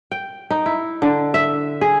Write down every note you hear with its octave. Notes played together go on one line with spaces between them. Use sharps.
G5
D#4
E4
D3
E5
G#4